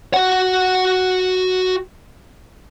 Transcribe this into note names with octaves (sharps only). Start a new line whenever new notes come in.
F#4 F#5